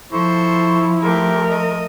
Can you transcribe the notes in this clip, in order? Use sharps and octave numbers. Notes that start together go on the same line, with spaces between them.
F3 E4 A4 C5 C#6
A3 G4 A#4
D#5